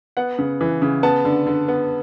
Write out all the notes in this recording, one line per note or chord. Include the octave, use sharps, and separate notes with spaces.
B3 F#5
C#3
E3
C#3
B3 A5
D3
D3
B3